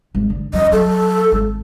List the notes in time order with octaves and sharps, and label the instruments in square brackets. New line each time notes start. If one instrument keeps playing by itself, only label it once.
[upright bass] G#1
D3
[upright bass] F#2 F3 [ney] D#5
[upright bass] F#3 [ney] A4
[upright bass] G#1